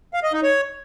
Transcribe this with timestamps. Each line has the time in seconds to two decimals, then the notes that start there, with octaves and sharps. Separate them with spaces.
0.14 F5
0.23 D#5
0.33 D#4
0.43 C#5